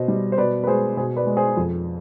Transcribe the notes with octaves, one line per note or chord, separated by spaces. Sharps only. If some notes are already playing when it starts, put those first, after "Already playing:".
Already playing: B2 C5 D#5
G3
C5
B2 B4 D5
B4
G#3 G#4 C5
B2 G#4 C5
B4 D5
G#3
G#4 C5
F2